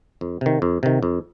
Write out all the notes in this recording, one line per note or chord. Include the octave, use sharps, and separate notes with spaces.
F2
C3 D#3
F2
C3 D#3
F2